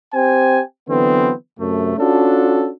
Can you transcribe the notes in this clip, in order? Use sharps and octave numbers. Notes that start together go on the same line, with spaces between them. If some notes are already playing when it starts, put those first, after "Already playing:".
C4 G4 C5 G5 G#5
D3 E3 F#3 B3 C4
F#2 C3 A3
C#4 D4 F4 F#4 A4